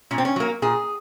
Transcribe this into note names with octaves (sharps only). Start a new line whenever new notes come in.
A#2 C#4
C4
C#4
F#3 A#3
A#2 G#4